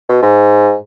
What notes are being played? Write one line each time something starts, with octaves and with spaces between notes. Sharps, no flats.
B2
G#2